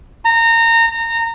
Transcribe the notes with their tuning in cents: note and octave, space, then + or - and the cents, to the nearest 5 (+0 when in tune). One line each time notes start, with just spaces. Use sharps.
A#5 -25